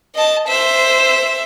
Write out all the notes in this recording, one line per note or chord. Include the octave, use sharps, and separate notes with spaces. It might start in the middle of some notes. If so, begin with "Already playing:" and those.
D#5 A5
C5 E5